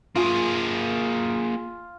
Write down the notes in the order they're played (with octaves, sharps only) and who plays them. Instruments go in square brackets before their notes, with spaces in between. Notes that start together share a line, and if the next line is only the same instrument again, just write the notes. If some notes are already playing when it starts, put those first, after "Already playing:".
[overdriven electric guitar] A#3 G#4 [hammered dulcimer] F4